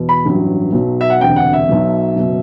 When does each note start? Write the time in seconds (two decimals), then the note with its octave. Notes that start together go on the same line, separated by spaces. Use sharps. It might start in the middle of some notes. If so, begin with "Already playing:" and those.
Already playing: E2 B2
0.09 B5
0.25 A1 G2 F#3
0.73 B1 B2 F#3
1.01 E5
1.10 F#5
1.20 E1 D2 C3 G5
1.36 F#5
1.53 E5
1.69 B1 B2 F#3
2.16 F#1 B2 F#3